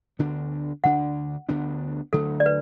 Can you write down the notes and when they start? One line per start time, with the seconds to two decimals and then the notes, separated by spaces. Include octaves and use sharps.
0.19 D2 D3 B3 D4
0.84 D2 D3 B3 D4 F#5
1.49 D2 D3 B3 D4
2.13 D2 D3 F#3 A3 A4
2.40 D5
2.46 B4